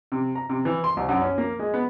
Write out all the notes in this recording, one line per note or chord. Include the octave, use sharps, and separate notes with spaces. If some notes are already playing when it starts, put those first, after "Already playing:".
C3
A#5
C3
E3
C6
C2
F#2
C#4
A#3
G#3
B3